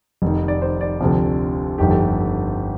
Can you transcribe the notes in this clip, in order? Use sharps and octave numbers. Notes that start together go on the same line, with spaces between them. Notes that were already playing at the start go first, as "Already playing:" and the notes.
F1 F2 D#3
D5
C5
D5
D2 C3 F3
G1 F2 D#3 G4
A4
G4